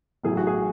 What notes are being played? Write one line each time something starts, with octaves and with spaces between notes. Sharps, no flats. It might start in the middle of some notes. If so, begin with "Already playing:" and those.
A1 A2 F#3 G#4
F#4
G#4